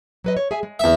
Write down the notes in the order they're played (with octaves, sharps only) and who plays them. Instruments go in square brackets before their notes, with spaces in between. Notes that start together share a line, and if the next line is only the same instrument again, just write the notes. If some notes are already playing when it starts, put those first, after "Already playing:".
[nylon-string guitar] F#3 B4 D#5
C#5
G#4 E5 G#5
G#3
[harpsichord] E2 E5